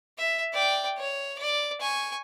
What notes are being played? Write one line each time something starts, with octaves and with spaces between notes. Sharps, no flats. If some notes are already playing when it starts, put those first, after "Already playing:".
E5
D5 G5
C#5
D5
G#5 C#6